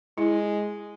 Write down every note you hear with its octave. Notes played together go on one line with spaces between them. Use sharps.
G#3 E4